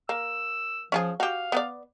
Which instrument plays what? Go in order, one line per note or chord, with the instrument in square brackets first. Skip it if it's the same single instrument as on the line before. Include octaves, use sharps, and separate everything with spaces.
[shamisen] A#3 [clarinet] E6
[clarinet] F3 [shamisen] C#4 F4 G#4
[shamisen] F#4 G4 [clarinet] F5
[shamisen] B3 B4 D5